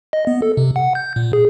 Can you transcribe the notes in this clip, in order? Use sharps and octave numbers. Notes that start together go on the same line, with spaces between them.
D#5
B3
A4
C3
F#5
G6
A#2
G#4